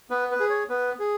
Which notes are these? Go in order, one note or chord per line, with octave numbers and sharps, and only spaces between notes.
B3 B4
B4
G#4
C#5
B3 B4
G#4